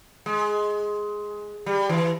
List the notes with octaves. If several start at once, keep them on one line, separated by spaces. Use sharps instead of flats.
G#3
G3
E3